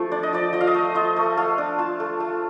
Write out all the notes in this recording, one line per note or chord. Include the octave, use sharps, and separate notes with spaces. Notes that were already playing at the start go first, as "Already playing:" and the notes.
Already playing: F3 A3
D4 D5
D#5
F3 D5
F3 D#5
F5
D#5
A3
F4 D#5
A3
A3 F5
D4
F4 A5
A3
A3